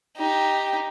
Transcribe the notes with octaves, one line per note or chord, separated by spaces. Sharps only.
D#4 G4